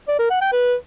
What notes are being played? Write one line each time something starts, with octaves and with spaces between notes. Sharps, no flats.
D5
A#4
F#5
G5
B4